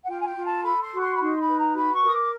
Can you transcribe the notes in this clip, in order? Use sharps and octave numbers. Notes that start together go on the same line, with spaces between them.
F#5
F4 G5
G#5
G5
F4
A5
A4 B5
C6
F#4
C6
B5
D#4 C6
B5
B4
A#5
F#4 B5
C#6
A#4 D#6
D6